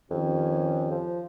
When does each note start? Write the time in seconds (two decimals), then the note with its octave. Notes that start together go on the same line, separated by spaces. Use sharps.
0.11 F2 D#3 C#4 G4
0.91 F3